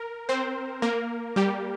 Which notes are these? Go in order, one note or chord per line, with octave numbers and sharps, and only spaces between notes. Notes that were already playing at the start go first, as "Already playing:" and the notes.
Already playing: A#4
C4 C5
A#3 A#4
G3 G4